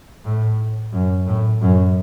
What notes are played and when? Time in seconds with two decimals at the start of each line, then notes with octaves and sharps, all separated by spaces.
0.24 A2
0.92 F#2
1.27 A2
1.61 F#2